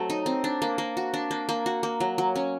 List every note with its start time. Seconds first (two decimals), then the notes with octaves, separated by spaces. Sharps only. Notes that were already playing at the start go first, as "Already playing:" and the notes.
Already playing: F#3 A3 C4
0.10 D#4
0.26 C4
0.44 D4
0.62 A#3
0.78 A#3
0.97 F#4
1.14 D4
1.31 A#3
1.49 A#3
1.66 F#4
1.83 A#3
2.00 F#3
2.18 F#3
2.36 C#4